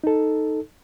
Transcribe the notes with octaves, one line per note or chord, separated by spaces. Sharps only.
D#4 A4